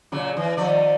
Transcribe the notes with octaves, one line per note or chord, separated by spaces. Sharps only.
A#2 C#3 F#3
E3
D#3 F3 D5